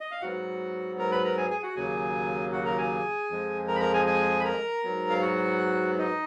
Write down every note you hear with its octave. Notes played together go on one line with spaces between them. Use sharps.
D#5
F5
G#2 F#3 B3 F#4 F#5
A#4 A#5
B4 B5
A#4 A#5
G#4 G#5
G#4 G#5
F#4 F#5
D#2 C#3 F#3 A#3 G#4 G#5
F#4 F#5
A#4 A#5
G#4 G#5
F2 F3 G#3
A#4 A#5
B5
A#4 A#5
G#4 G#5
G#4 G#5
B5
A#4 A#5
G#2 F#3 B3
F5
F#4 F#5
D#4 D#5